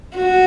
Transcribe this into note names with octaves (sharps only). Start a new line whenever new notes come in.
F#4